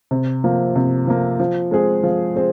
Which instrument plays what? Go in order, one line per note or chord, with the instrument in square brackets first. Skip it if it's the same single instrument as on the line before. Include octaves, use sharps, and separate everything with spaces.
[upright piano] C3
F3 A#3
C3
F3 A#3
F3
G#3 C4 G#4
F3
G#3 C4